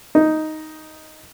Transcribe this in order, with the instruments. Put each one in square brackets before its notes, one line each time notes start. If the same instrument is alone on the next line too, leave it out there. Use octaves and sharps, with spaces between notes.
[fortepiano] D#4